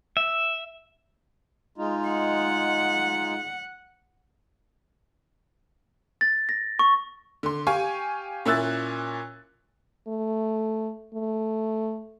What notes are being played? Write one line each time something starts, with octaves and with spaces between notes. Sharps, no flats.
E5
G#3 D#4 F4
F#5
A6
A#6
C#6
D3 C6
G4 F5 G#5 C#6
A#2 C#4 E4 E6 F#6 A6
A3
A3